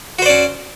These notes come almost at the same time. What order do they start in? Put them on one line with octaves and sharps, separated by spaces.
F#4 C5 D5 C#4